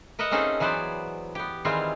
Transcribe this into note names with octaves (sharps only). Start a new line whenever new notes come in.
A#4 B4 D#5 E5 F#5
A#3 C4 C#4 D#4 G#4 A4
E3 F#3 B3 B4 C5 D5
B3 G4
D#3 E3 G3 G#3 C4 F4